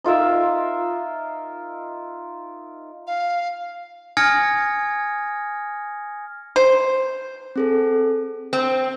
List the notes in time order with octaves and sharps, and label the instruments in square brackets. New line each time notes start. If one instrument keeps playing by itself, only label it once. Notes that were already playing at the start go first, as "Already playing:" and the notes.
[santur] D#4 F4 A#4 E5
[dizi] F5
[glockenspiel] G#5 D#6 F6 G#6 A#6 C#7
[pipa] C5
[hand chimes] C4 G#4 A4
[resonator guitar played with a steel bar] C4